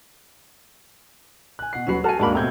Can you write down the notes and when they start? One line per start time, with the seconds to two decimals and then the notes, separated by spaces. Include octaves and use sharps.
1.59 G#5 F#6
1.73 B2 F#5 C7
1.87 D#1 F#3 C#4 F#4 B4 C7
2.04 F#4 A4 G#5 F6
2.20 D#2 G#2 A#3 D4 F#4 A#4 B5
2.35 B2 A3 C4 A#5 G6 G#6